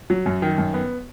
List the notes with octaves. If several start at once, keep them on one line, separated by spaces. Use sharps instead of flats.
F#3
F#2
D#3
F#2
B3